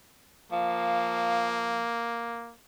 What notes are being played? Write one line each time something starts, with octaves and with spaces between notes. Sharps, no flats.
F3 A#3